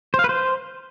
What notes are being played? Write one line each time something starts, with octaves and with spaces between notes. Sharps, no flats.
C5
F5
B4
C5